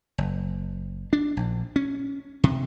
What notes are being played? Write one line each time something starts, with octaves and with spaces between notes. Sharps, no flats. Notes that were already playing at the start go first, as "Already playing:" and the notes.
F#1
D4
A#1
C#4
C3